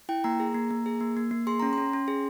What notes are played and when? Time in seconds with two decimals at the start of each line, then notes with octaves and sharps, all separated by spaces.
0.09 E4 G5
0.24 A#3 A#5
0.40 G#4
0.54 A#3
0.71 A#3
0.86 G#4
1.01 A#3
1.17 A#3
1.31 A#3
1.47 G#4 C6
1.60 C#4 A#5
1.73 C#4 C6
1.93 C#4
2.08 G#4